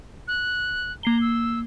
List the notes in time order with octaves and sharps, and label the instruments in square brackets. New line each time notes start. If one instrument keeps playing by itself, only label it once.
[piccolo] F#6
[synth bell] A#3 C7 G7 [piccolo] A#5
[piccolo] E6